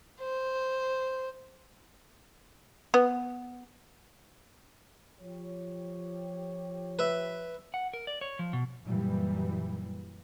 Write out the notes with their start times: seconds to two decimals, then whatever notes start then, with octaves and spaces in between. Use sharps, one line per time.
0.20 C5
2.94 B3
5.21 F3 G4 C#5
6.99 B4 E5
7.74 F#5
7.94 A#4
8.07 D5
8.21 C#5
8.39 F3
8.53 B2
8.83 F#2 A#2 E3 F#3 G3